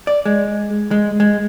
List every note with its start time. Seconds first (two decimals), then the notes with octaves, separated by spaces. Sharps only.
0.07 D5
0.25 G#3
0.91 G#3
1.20 G#3